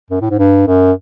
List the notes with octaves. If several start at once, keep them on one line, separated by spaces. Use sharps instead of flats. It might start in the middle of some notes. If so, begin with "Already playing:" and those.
F#2
A2
G#2
G2
F#2